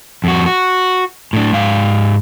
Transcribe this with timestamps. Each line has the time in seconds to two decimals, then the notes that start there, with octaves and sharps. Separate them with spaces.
0.24 F2 F#4
0.46 F#4
1.33 A2 D4
1.53 G#2 F5